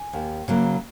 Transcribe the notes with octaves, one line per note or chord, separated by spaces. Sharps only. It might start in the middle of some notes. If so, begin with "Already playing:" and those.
Already playing: G#5
D#2
C#3 F#3 A#3